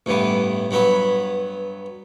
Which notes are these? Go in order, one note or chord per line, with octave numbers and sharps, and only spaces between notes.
A1 G2 E3 B3
G2 F#3 B3 B5